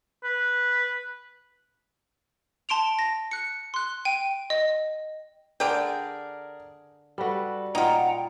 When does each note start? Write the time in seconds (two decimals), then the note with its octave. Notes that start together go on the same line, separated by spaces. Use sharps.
0.24 B4
2.69 A5 C6 D7 F7
2.99 A#6
3.31 F#6 C#7
3.74 C6 F#6
4.05 G5 D#7
4.50 D#5
5.60 D3 G#4 A#4 D5 G5
7.18 G3 F#4 A4 B4
7.75 A#2 D#4 F4 F#5 G5 A#5